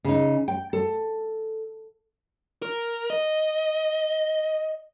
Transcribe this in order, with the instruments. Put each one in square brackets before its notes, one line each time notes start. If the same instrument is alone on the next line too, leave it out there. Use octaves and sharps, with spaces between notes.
[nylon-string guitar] C#3 D#4
G5
A4
[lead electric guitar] A#4
D#5